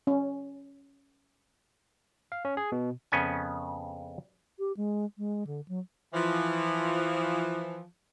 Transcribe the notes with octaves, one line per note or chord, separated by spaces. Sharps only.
C#4
F5
C#4
G#4
B2
F2 C#3 B3 C#4 G#5
G4
G#3
G#3
D3
F#3
E3 F3